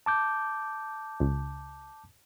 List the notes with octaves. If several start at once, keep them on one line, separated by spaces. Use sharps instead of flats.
A5 D6 G6
C#2